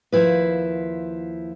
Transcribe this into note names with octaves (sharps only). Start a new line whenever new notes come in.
D#2 F3 E4 B4